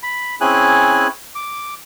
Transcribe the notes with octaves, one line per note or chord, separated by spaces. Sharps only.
B5
C4 C#4 E4 G#4 G#5 F#6
D6